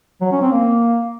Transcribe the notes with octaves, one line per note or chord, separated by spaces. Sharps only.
F#3
C#4
C4
A#3